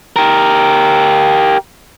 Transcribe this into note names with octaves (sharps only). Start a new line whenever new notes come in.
G4 A#4